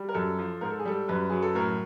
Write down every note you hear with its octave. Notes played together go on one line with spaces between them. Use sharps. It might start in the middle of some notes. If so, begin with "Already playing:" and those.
Already playing: G3
A#4
F#2 A4
F3
G#2 A#4
A4
G#4
G3 A4
F#2 B4
F#3 G#4
A4
A2 A#4